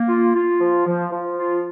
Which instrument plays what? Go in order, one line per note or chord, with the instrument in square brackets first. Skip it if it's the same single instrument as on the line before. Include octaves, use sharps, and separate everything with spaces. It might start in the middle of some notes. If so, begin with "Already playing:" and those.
Already playing: [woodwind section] A#3
F4
F4
F3
F3
F3
F4